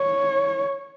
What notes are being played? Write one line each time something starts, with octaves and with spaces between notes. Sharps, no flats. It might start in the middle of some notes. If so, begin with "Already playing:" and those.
Already playing: C#5